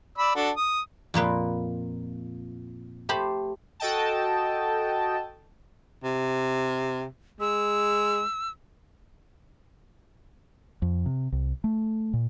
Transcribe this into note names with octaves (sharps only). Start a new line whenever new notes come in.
D5 B5 E6
D4 F#4 A4
D#6
F2 A#2 A#3 B4
A3 G4 C5 B5
F#4 A4 D#5 G5 A5
C3
G#3 E6
F2
C3
C2
A3
A#2